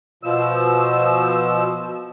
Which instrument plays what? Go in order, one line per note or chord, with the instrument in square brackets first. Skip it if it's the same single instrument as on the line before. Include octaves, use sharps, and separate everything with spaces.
[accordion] B2 F3 E6